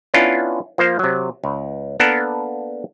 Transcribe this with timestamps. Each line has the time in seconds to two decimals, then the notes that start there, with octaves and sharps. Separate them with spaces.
0.14 B3 C#4 D4 E4 F4
0.78 F3 A#3 C5 F5
0.99 C3 F#3
1.44 C#2
2.00 A#3 B3 D4 A4 A#4 F#5